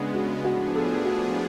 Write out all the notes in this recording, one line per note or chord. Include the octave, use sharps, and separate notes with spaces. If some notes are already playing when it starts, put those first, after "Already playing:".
Already playing: C#3 G#3 B3 D4
F#4
A2 F3 B3 D4 F#4 G#4
A4
F#4